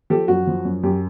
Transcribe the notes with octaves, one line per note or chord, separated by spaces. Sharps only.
F3 G4 A4
F#2 F#4
F3
F#2
F#2 G4